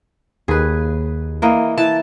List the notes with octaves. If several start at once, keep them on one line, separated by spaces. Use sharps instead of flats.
D#2 G#4 B4
E3 A#3 D#5
E3 A5